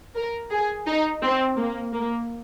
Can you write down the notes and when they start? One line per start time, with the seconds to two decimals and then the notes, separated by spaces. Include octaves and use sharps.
0.16 A#4
0.51 G#4
0.86 D#4
1.22 C4
1.57 A#3
1.93 A#3